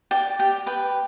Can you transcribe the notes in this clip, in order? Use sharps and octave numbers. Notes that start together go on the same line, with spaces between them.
D5 G5
G4 G5
B4 G5